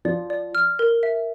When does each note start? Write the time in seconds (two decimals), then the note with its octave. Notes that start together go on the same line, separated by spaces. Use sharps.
0.05 F3 D5
0.30 D5
0.55 F6
0.79 A#4
1.03 E5